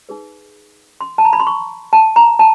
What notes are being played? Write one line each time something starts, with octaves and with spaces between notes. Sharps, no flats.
D#4 G#4 B4
C6
A5
A#5
B5
C6
C#6
A5
A#5
A5